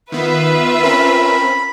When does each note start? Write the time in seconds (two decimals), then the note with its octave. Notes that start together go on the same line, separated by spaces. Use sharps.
0.12 D#3 B3 F4 B4 E5
0.84 C4 C#4 A#4 B5